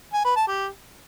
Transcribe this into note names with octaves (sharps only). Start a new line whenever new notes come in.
G#5
B4
A5
G4